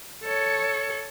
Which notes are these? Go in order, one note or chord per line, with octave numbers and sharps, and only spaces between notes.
A4 C#5